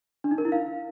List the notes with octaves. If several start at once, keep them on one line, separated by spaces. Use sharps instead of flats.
D4
D#4
A#4
E4
F5